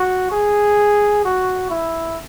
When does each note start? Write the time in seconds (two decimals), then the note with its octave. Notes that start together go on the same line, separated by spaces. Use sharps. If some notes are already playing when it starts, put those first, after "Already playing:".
Already playing: F#4
0.32 G#4
1.25 F#4
1.70 E4